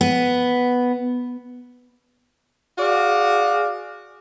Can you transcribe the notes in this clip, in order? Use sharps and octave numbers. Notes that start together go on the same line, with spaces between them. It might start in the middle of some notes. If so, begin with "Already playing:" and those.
B3
F#4 G#4 D5 F5